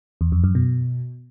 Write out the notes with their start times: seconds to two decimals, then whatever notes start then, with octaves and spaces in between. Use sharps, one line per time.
0.21 E2
0.32 F2
0.44 F#2
0.55 B2